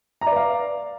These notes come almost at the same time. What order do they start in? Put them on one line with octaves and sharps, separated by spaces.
A#5 D5 B4 F5